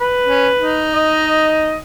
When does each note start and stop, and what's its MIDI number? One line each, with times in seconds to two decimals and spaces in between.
0.01 0.88 71
0.24 0.50 61
0.59 1.78 63
0.95 1.77 75